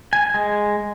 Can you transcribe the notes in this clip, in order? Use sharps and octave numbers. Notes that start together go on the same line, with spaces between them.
G#5
G#3